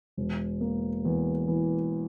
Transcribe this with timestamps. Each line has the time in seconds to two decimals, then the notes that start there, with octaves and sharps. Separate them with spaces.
0.17 E1
0.61 A#3
1.05 E2
1.48 E3